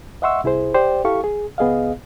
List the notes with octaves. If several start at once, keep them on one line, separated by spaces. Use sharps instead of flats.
D#5 E5 F#5 C6 C#6 E6
C2 E4 G#4 C5
G4 C5 D5 G5
E4 G4 A4 F5 C#6
G#4
C#2 B3 G#4 D#5 F5